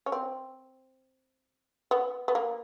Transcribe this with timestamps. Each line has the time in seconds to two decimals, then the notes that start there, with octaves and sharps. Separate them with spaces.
0.06 C#4
0.12 C4
1.91 B3
2.28 B3
2.35 A#3